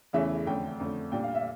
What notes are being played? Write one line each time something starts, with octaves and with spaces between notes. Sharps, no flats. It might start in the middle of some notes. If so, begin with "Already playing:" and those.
E2 C#3 E3 A3 C#4 E5
F2 D3 A3 C#4 G5
F2 D3 A3 C#4
A#2 G3 D4 G5
F5
E5